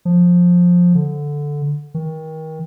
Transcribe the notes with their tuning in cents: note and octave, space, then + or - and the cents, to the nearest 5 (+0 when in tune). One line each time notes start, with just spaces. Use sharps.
F3 +15
D3 -5
D#3 +30